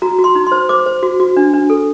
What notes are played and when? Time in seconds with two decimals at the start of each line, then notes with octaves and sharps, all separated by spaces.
0.02 F#4 A#5
0.18 F#4
0.24 C6
0.35 D#4
0.47 C6
0.52 C5
0.69 C5 D6
0.86 C5
1.03 F#4
1.20 F#4
1.37 D4
1.54 D4
1.70 A4